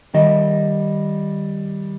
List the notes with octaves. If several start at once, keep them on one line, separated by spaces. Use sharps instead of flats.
D#3 G3 D#5